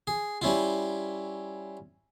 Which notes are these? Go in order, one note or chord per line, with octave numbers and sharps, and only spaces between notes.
G#4
G3 C#4 E4 F4